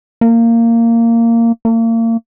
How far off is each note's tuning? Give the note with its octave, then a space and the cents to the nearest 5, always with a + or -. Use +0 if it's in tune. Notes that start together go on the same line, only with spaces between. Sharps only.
A#3 -15
A#3 -35